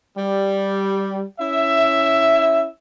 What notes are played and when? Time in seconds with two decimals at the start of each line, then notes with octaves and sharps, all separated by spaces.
0.17 G3
1.40 C#4 E4 E5